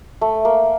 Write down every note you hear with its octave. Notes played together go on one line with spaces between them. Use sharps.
A3
A#3